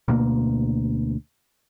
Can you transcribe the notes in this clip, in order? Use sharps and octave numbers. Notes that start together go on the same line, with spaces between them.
D2 B2 A#3